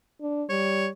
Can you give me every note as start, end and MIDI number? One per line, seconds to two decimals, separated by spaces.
0.21 0.44 62
0.50 0.89 55
0.50 0.88 73